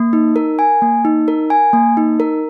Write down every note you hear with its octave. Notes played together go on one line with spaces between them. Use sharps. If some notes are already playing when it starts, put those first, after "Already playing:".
Already playing: A#3
D#4
A#4
G#5
A#3
D#4
A#4
G#5
A#3
D#4
A#4